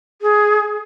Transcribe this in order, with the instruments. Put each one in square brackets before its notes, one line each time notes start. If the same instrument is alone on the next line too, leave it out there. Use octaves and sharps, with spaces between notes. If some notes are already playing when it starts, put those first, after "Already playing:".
[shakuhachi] G#4